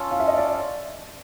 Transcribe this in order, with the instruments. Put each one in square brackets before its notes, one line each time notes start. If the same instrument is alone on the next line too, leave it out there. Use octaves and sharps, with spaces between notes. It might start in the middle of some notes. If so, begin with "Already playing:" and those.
Already playing: [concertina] C#4 F4 A4
[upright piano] F5
E5
D#5
D5